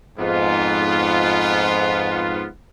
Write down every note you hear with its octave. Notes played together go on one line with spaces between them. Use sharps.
F2 G#2 B3 F4